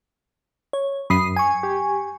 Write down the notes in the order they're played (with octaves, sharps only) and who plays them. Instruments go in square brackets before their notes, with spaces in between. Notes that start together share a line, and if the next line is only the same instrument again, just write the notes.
[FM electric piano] C#5
[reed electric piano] F#2 [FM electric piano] B5 D#6 C7
[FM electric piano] G#5 C#6
[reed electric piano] G4